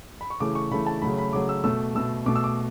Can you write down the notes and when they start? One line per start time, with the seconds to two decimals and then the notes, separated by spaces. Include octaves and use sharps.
0.21 B5
0.30 C#6
0.40 C#3 E3 A3 D6
0.55 C#6
0.71 C#3 E3 A3 B5
0.87 A5
1.02 C#3 F#3 A3 B5
1.18 B5
1.33 C#3 F#3 A3 D6
1.49 E6
1.64 B2 A3 E6
1.95 B2 A3 E6
2.26 B2 A3 D6
2.36 E6
2.44 D6